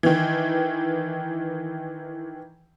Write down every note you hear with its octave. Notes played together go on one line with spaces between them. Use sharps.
D#3 E3